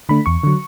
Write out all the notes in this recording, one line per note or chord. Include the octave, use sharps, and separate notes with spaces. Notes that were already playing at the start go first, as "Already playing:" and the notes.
D3 A3 D4 B5
E2 C#6
D3 F#3